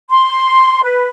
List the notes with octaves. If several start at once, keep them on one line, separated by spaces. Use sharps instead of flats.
C6
B4